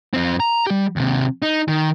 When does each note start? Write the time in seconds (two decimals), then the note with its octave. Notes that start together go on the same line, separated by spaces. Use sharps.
0.14 F2 C4
0.40 A#5
0.67 G3 G4
0.96 D#2 C3
1.42 D#4
1.68 D#3